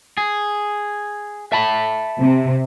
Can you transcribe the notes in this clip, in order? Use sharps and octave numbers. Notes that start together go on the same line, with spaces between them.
G#4
E5 A5 B5
C3